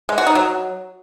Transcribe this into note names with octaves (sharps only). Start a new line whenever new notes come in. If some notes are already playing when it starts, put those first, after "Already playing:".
G#3
F#4
D#4
F#3